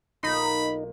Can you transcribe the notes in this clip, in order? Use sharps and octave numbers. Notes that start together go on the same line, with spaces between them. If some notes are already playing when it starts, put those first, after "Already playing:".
B1 A#3 D#4 F4 B5